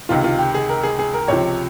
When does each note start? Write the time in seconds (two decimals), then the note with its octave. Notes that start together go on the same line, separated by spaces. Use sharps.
0.09 C#2 C3 D#3 F4
0.24 F4
0.39 G4
0.54 G#4
0.69 A#4
0.83 G#4
0.99 G#4
1.14 A#4
1.28 C#2 C3 F3 C#5